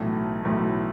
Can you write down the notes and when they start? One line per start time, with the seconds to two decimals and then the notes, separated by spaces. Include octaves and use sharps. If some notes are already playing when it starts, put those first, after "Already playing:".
Already playing: B1 A2 E3 A3
0.43 B1 A2 E3 A3